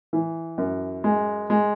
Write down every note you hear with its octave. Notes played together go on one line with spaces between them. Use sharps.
E3
F#2
G#3
G#3